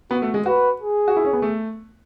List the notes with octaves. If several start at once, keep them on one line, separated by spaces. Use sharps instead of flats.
B3 F#4
A3
G#3
F#4 B4
G#4
F#4
E4
C#4
B3
A3